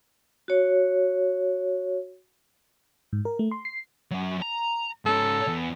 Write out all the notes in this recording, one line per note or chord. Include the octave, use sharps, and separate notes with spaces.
F#4 C#5
G#2
A#4
A3
C6
C7
F#3 C#4
A#5
G#2 C#4 A4
E2